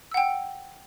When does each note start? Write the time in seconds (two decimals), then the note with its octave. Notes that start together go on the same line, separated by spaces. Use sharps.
0.11 E6
0.14 F#5
0.17 G5